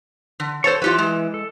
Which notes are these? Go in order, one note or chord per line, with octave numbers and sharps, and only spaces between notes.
D3
A4 C5 C#5 A5 C#6
E3 F4 G4 B4
G#3
A4